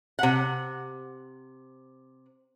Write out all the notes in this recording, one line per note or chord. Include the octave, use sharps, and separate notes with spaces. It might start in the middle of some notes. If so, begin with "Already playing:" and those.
C3 F#5